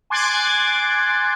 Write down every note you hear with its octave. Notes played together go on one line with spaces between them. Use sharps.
G#5 C6 D6 F#6 G#6 A6